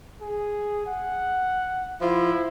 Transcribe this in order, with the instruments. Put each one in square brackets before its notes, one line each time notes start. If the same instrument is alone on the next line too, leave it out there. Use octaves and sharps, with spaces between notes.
[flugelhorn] G#4
F#5
[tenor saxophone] F3 [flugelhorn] E4